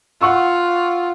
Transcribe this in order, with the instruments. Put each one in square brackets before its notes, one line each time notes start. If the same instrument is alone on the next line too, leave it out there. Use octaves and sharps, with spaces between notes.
[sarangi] F4 [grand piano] F#5 C#6 E6